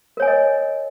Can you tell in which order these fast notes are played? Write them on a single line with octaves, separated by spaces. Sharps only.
A#4 C#5 G#5 D#6 D#5